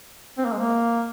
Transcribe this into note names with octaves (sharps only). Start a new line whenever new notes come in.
C4
A#3
G#3
A#3